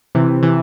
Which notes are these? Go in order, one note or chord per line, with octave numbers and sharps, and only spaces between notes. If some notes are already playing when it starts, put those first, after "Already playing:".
C3 E3
C3 E3